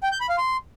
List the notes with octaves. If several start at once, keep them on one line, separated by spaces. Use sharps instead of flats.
G5
G6
B5
F5
C6